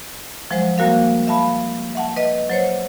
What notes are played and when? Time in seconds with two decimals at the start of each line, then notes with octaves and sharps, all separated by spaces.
0.51 F3 F#3 G#3 C5
0.78 G3 A#3 F#4 A#4 F5
1.27 E5 F5 A5 B5
1.95 E5 F#5 A5
2.16 B4 D#5 E5
2.50 F#3 C5 C#5